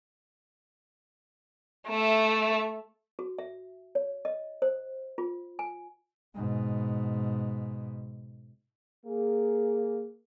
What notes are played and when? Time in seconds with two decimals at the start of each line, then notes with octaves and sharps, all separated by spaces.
1.90 A3 E5
3.19 F#4
3.39 E5
3.95 C#5
4.25 D#5
4.62 C5
5.18 F4
5.59 G#5
6.35 G#2 B2
9.06 A#3 G#4